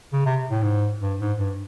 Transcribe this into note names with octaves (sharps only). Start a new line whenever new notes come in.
C#3
C3
A2
G#2
G2
G#2
G2